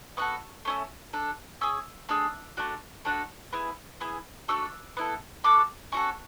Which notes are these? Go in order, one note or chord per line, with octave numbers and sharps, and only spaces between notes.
B3 F#4 A4 C#6
A3 C#4 E4
D4 A4
C#4 G#4 E6
A3 D4 G#4 E6
A3 D4 F#4
A3 D4 F#4 A4
B3 E4 G#4
B3 E4 G#4
A3 D4 F#4 A4 E6
B3 E4 A4
D4 F#4 A4 D6
C#4 F#4 A4 C#6